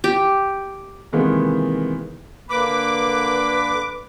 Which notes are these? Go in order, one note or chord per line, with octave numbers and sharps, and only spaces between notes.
G4
C3 D#3 E3 G#3 A#3 B3
D3 A#3 B4 B5 D6